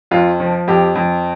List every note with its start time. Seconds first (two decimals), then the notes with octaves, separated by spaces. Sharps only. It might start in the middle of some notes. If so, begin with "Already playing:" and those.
0.11 F2 F4
0.40 F3
0.68 F2 G4
0.95 F2